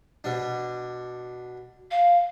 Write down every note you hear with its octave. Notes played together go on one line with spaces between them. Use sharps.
B2 D4
F5